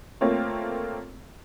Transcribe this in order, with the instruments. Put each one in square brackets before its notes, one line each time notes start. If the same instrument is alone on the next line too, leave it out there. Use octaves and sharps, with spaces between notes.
[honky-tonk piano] A3 A#3 C4 F4 C#5